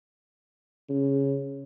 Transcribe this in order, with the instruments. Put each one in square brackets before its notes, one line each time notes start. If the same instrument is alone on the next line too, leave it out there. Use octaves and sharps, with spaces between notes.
[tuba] C#3